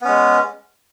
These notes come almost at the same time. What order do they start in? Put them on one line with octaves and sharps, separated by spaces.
B3 C#4 G#3